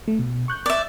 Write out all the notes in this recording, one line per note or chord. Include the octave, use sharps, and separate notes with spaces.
A3
B2
C#6 F#6 G6
D5 E5